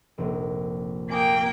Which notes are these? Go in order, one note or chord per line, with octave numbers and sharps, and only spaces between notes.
F1 A#1
A#3 G5 G#5 D6 D#6